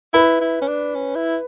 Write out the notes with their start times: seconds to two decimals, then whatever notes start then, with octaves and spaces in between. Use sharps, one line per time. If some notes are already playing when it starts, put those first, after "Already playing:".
0.13 E4 B4 B5
0.41 E4
0.62 C#4
0.68 D4
0.95 C#4
1.15 E4